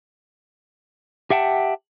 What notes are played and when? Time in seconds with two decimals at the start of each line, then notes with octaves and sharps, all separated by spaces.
1.30 G4 E5 F#5 G5 A5